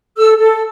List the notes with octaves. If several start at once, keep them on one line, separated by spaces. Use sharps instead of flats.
A4 E6
A4